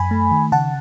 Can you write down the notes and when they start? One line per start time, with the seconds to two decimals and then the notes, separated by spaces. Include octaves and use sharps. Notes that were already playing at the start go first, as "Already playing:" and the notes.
Already playing: F#2 G#5 B5
0.11 A3
0.31 D#3
0.52 C#3 F#5 A5